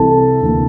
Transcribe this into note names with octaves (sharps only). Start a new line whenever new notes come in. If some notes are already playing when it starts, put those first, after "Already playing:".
Already playing: C2 C3 E3 A4 A5
D2 C3 E3 A#3